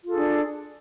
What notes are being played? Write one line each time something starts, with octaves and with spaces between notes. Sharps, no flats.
D4 F4 G#4 A4